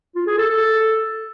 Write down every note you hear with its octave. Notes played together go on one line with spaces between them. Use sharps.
F4
G#4
A4
A4